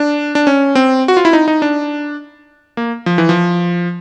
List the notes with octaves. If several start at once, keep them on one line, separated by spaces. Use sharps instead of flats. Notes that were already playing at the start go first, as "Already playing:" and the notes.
Already playing: D4
D4
C#4
C4
F#4
F4
E4
D#4
D#4
D4
A#3
F3
E3
F3